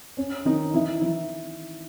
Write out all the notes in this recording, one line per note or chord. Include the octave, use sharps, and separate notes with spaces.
C#4
D#3 D#4
E3 E4
E3 E4